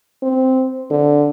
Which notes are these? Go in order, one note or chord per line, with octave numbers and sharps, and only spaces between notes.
C4
D3